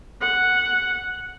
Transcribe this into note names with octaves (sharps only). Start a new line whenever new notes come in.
F#5